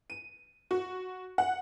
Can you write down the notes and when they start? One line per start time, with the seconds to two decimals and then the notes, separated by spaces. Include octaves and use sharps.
0.10 D#7
0.71 F#4
1.38 F#5